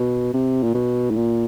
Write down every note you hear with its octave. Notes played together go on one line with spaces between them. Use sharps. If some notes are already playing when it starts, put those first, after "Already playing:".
Already playing: B2
C3
A#2
B2
A2
A#2